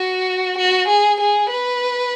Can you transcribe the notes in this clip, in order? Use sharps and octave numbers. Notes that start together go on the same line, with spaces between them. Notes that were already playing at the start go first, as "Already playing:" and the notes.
Already playing: F#4
F#4
G#4
G#4
B4